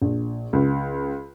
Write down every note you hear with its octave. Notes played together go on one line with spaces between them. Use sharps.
A#1
C#2